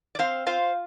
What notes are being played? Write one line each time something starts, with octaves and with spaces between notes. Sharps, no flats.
D5
C4 C5 F5
F4 C5 F5